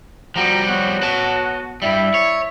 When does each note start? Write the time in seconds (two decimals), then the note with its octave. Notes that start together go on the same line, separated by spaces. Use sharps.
0.36 F3 G3 F#4 G5 A#5
0.68 F#3 B3 F#4
1.02 B4 A5
1.82 G2 G3 E4 D5 E5
2.14 C#5